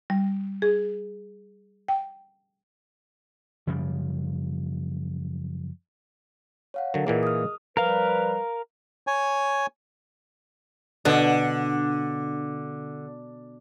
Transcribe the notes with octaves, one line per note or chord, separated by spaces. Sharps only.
G3
G#4
G5
F#2 C#3 F3 G3
C#5 F5 F#5
D3 F#3 A#4
A#2 E3 A#3 G#4 D#5
D#6 F6
F3 G3 A#4 B4 F5
C#5 G#5
B2 D3